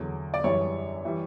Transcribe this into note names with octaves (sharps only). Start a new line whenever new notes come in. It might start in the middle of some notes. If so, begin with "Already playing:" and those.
Already playing: E2 D3 F#3
D5
F#2 E3 G3 C#5
E3 G3